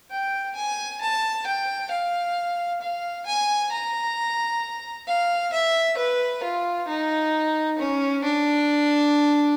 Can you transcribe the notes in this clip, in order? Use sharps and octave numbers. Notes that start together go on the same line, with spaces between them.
G5
G#5
A5
G5
F5
F5
G#5
A#5
F5
E5
B4
F4
D#4
C#4
D4